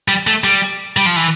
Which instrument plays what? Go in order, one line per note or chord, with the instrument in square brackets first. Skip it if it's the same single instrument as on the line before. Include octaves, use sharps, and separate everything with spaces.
[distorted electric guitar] G3
A3
G3
G3
F3
E3